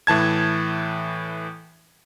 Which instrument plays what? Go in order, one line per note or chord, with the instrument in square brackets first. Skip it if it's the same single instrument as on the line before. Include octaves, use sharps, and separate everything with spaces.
[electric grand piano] A2 E3 A5 G#6